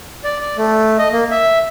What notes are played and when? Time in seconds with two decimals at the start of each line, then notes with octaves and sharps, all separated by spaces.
0.24 D5
0.41 D5
0.57 A3
0.99 D#5
1.12 A#3
1.31 E5